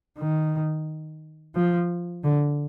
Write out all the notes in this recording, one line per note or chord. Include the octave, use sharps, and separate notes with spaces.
D#3
F3
D3